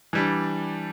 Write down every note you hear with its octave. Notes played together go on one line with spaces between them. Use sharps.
E3 G3 D4